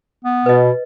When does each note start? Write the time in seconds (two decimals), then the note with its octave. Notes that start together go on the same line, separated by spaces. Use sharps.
0.25 B3
0.46 B2 B4 D#5